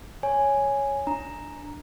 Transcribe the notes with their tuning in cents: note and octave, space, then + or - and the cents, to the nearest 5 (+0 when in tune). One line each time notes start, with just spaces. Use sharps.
C#5 +0 G#5 +0
D4 +0 A#5 +0